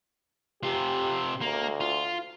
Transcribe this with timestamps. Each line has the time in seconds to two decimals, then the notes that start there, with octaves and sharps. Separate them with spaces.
0.63 C3 F4 G4
1.41 D2 A#3
1.80 F4